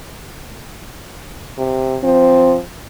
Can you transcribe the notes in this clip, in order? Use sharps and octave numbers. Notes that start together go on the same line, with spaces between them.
C3
F3 C4